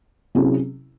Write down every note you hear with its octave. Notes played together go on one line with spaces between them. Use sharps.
C3 F#3 C#4 E4 G#4